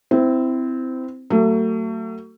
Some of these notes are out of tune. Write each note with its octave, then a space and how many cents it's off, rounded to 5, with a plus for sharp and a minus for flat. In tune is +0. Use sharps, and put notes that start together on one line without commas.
C4 -15 E4 +0
F#3 +25 A3 +35